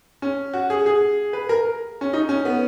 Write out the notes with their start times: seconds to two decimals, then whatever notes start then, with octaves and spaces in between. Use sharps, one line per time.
0.22 C#4
0.53 F#4
0.70 G#4
0.86 G#4
1.33 B4
1.49 A#4
2.01 C#4
2.13 D#4
2.29 C#4
2.45 B3